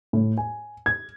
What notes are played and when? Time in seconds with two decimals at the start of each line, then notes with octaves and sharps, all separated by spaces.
0.13 A2
0.38 G#5
0.86 G#6